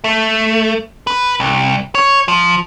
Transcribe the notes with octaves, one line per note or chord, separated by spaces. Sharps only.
A3
B4
C2
C#5
F3